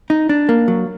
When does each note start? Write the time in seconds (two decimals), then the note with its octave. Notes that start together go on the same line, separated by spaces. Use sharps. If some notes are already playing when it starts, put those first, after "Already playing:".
0.10 D#4
0.29 D4
0.49 A#3
0.68 F#3